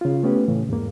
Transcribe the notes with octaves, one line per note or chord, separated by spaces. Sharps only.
C#3 F4
A3 B3 C#4 G4 B4
A2 C#3 E3
E2 G#2 A#3